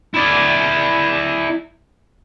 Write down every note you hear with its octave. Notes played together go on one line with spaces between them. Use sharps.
E4 D5